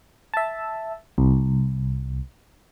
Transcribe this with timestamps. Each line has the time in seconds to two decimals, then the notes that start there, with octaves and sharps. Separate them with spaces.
0.34 E5 A5
1.18 C2